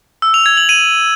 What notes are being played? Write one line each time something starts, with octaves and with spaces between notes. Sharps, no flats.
E6
F7
G#6
F#7
D#7